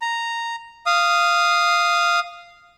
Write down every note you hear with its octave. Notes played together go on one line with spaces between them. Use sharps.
A#5
F5 D#6